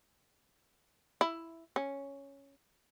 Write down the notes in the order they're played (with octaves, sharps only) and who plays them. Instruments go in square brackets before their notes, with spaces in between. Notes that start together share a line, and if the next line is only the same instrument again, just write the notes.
[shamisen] E4
C#4